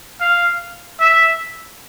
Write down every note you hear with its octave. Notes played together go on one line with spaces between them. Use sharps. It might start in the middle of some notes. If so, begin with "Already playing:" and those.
F5
E5